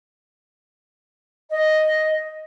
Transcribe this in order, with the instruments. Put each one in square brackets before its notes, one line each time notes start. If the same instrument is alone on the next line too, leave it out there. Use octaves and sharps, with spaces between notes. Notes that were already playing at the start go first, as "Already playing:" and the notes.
[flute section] D#5